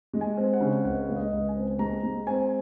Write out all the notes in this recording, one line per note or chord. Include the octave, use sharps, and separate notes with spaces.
G#3
G#5
C4
F#5
C#3
C#2 F#5
G#3 F5
D#5
C#2
G#5
C4
G#3 A#5
G#3
C4 G#5